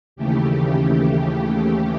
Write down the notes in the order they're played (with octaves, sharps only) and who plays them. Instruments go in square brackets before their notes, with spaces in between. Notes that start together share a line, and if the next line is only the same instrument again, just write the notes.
[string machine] D#2 C#3 E3 A3 G4